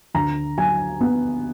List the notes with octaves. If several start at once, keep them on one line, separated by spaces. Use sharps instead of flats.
D2 A#5
F#3 G#5
B3